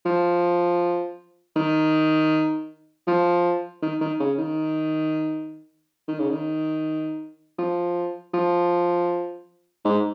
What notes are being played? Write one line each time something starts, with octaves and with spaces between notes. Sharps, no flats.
F3
D#3
F3
D#3
D#3
C#3
D#3
D#3
C#3
D#3
F3
F3
G#2